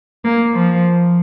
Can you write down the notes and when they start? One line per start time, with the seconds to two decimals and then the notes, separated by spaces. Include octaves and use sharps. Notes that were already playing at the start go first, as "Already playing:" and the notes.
0.25 A#3
0.53 F3